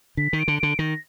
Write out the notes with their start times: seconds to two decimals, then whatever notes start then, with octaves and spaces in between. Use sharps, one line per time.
0.17 D3 B6
0.33 D#3
0.39 D7
0.48 D3
0.59 D3 D7
0.78 D#3 A#6